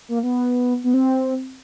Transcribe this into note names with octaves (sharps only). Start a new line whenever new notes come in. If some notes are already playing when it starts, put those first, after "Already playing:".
A#3
B3
B3
C4